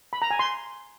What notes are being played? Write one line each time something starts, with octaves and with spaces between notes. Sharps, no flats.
B5
A#5
G#5
C6